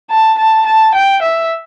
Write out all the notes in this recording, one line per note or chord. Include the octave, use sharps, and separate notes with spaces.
A5
A5
A5
G5
E5